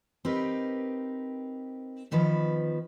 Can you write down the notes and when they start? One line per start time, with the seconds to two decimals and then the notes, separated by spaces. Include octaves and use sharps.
0.25 C4 D#4 G4 A#4 B4
2.11 E2 D#3 F3 B4